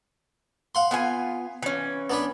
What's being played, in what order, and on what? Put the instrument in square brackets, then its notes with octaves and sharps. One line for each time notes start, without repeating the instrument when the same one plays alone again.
[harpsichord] F5 F#5 C6
[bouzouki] B3 F4 G#5
E3 C#4
[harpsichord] B3 D4 B4